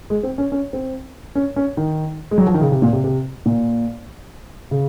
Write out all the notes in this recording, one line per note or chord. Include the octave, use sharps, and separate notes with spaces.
G#3
C4
C#4
C#4
C4
C#4
C#4
D#3
G#3
F#3
F3
D#3
C#3
C3
A#2
C3
C3
A#2
C#3